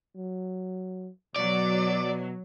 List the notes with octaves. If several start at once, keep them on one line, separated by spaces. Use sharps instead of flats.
F#3
B2 F#3 D5